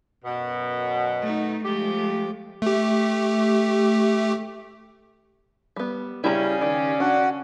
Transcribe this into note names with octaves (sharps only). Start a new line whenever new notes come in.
F#2 B2
A3 D#4
F3 G#3 A3 G4
A3 G4
G3 B3
C#3 G3 C#4 E4 G#4 A#5
D#3 G4 D5
D4 F#4 F#5